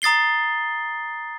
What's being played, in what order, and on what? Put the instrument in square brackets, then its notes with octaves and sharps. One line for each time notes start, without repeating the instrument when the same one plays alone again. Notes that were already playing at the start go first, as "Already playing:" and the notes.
[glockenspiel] A#5 D#6 A6 C7 G7